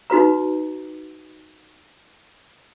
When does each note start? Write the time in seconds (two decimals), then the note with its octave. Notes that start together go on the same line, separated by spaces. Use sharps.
0.10 D#4 F#4 B4 A#5